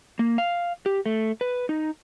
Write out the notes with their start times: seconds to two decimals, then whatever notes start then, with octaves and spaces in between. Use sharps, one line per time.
0.19 A#3
0.38 F5
0.86 G4
1.06 A3
1.41 B4
1.69 D#4